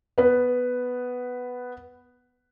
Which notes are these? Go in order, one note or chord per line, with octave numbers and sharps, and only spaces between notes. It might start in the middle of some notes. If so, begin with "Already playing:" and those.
B3 B4